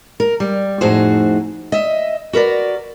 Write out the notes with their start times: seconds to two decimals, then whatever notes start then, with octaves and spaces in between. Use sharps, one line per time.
0.20 A#4
0.40 G3
0.81 F2 A2 D#4 F#4 G#4 C5
1.72 D#5 E5
2.33 F#4 A#4 B4 D5